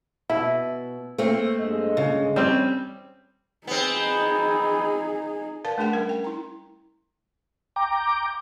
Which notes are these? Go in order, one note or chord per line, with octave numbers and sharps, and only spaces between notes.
B2 E4
A3 A#3 C4
G2 G#3 D#5
C#3
G3 C4 C#4
B3 C4 D#4 G#4
A#4 B4 D5 F5 A5
A3 D4 G#4 F#5 G5
G3 C#4 A#4
G5
E4 A#5
G5 A#5 D6